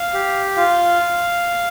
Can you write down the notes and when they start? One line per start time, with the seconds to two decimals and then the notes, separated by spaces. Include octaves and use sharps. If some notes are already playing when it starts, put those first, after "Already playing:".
Already playing: F5
0.14 G4
0.57 F4 F5